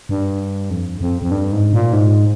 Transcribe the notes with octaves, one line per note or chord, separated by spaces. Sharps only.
G2
F2
F2
F2
G2
G#2
A#2
G#2